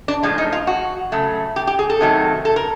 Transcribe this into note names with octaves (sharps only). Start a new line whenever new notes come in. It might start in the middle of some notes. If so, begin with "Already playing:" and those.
D4
A2 F3 G#3
D#4
F4
F#4
C#3 F#3 A3
G4
G4
G#4
A4
C3 D#3 F#3 A3
A4
A#4